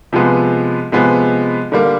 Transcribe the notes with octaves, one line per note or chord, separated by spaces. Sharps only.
C3 F3 G#3 B3
C3 F3 G#3 B3
D3 G3 A#3